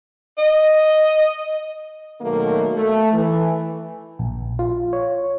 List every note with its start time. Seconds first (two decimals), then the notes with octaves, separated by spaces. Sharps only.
0.38 D#5
2.21 B2 D#3 F#3 A3 A#3
2.74 A3
3.12 E3
4.19 A#1
4.59 F4
4.93 C#5